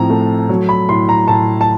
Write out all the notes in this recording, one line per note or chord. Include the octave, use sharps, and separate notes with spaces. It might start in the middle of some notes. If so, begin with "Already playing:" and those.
Already playing: A2 F3 C4 A#5
A3
F#3
B5
A2 C6
A#5
A2 A5
A5